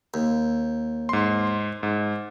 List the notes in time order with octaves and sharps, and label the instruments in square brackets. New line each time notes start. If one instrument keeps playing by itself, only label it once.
[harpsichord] D#2
[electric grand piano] G#2 C6
G#2